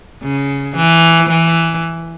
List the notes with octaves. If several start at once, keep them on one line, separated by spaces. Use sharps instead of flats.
C#3
E3
E3